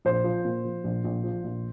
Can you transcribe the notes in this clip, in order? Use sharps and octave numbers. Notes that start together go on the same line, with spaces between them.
A#1 C5
F3
A#2
F3
A#1
A#1
F3
A#1